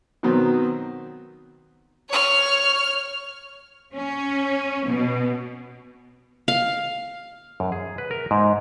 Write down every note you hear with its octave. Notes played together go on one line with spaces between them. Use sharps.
B2 D#3 F#3 B3 C4
C#5 F6
C#4
B2
F5
F#2
G#4
B4
A#4
G#2